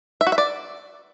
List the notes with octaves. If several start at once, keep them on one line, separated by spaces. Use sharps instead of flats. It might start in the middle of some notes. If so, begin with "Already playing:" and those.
E5
F#4
E5
D5